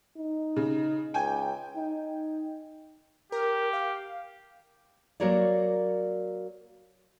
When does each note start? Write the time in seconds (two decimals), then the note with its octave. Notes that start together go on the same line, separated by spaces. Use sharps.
0.18 D#4
0.56 C#3
1.14 C#2 G5 G#5
1.77 D#4
3.32 G4 A#4
3.73 F5
5.20 F#3 A#3 F#4 A#4 C#5 D5